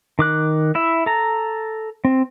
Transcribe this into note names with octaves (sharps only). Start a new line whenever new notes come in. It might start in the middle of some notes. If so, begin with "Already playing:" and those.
D#3 D6 F#6
E4 E5
A4 A#5
C4